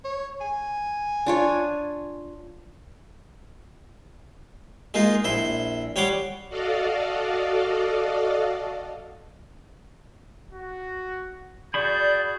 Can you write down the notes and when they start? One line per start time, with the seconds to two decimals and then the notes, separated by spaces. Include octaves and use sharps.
0.04 C#5
0.41 G#5
1.26 D4 F4 C#5
4.94 G#3 A#3 D#4 F4
5.24 A#1 E4 C6
5.96 G3 C#5 F#5 C6 D6
6.49 F#4 A4 D5 D#5 F5
10.51 F#4
11.74 F#4 G#4 D5 B5 G6